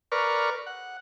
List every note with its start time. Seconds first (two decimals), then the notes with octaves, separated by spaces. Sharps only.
0.12 A#4 B4 D5 C#6 F6
0.66 F#5